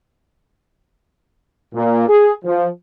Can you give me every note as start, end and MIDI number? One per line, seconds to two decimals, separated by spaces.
1.75 2.06 46
2.08 2.32 68
2.44 2.67 53